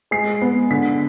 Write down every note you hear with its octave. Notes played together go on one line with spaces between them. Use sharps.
G#3 C7
B3
D3 B6